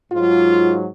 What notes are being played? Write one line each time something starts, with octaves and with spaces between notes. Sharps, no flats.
G#2 F#3 F4